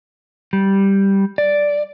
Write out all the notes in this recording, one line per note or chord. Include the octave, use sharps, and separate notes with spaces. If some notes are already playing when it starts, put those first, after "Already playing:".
G3
D5